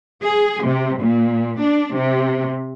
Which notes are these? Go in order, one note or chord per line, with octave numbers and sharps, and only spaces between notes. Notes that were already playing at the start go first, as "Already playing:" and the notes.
G#4
C3
A#2
D4
C3